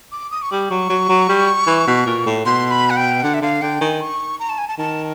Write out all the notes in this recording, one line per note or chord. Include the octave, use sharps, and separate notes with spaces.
D6
D#6
C#6
G3 D6
F#3 C#6
F#3
F#3
G3
E3
B2
A#2
A2
B2 C6
B5
F#5
G5
D3 F#5
E5
D3 F5
D3 G5
D#3 G#5
C#6
A#5
A5
G#5
A5
D#3 A5